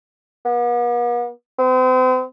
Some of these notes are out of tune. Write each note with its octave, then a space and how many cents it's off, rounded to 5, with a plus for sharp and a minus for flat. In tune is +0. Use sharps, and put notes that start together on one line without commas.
B3 -45
C4 -40